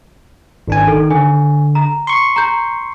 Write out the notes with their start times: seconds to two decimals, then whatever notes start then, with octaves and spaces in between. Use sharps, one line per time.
0.68 G#1 D4 G#5
0.87 D#3 A4
1.11 D3 G#5
1.75 A#5
2.07 C6 C#6
2.36 A#5 G6